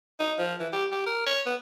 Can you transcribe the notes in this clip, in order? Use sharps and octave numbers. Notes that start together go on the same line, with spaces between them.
D#4
F3
E3
G4
G4
A#4
C#5
B3